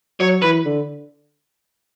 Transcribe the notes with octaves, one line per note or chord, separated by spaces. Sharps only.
F#3 C#5
E3 B4
D3